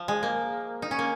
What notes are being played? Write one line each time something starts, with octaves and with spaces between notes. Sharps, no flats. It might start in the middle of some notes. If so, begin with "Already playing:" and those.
Already playing: F3
G#3
A#3
D#4
C#4
A#3